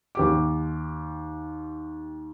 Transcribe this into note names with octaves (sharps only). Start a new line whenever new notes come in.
D#2 G4 D6